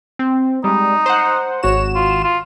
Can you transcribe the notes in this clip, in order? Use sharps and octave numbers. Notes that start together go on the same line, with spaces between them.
C4
G3 G#3 D#4
C5 F#5
G#1 F#4 C#5 E7
F4
F4